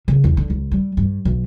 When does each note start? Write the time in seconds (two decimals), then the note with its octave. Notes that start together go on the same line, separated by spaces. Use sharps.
0.08 C#3
0.24 E2
0.37 D3
0.50 C#2
0.71 G3
0.97 G2
1.25 B1